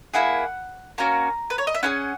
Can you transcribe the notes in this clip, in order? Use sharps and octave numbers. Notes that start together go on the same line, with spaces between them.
A#3 E4 G#4 F#5
A#3 C#4 F#4 A#5
B4
C#5
D#5
E5
C#4 E4 G#4 F#5